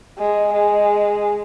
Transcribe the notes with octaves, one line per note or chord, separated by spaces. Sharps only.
G#3
G#3